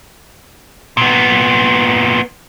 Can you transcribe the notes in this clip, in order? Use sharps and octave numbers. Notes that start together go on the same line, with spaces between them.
A#2 B3